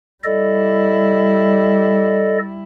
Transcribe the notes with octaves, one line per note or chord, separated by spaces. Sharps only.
G3 E4 A4 D5 D#5